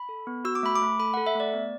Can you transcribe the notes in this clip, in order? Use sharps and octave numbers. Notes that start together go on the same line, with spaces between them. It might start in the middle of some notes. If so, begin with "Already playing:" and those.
Already playing: B5
A4
B3
F#4 E6
D6
A3 B5
D6
A3
A4 B5
A4 F#5
E5
A3 D5
B3